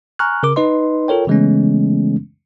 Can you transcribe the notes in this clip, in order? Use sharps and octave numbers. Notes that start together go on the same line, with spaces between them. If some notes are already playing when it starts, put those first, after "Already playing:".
G#5 A#5 C#6 F6 F#6
C#3 A#4 D6
D#4 B4 D#5 C6
F4 A4 A#4 C#5 G5
C#3 E3 G#3 A3 B3 C#4